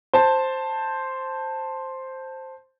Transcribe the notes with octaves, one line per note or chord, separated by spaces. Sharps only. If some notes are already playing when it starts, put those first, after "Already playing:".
C5 A5